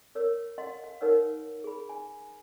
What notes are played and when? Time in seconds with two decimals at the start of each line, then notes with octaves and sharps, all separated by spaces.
0.15 A#4 C#5 E6
0.58 D#5 F5 F#5 C6
0.84 F5
1.01 D#4 A#4 B4 C#5 F#5 E6
1.64 G#4 B5
1.89 G#5